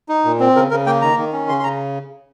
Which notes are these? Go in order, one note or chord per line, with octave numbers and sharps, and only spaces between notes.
D#4
A#2
C4
C#3 A#4
C#3 A#4
A#3 G5
D#3 A#5
D#3
C#4
C#3 C6
C6
C#3 A#5